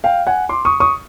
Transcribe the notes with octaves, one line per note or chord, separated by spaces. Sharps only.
F5 G5
F#5 G#5
C6 D6
C#6 D#6
C#6 D#6